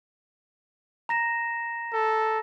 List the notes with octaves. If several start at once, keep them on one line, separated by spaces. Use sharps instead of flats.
A#5 A#6 E7
A4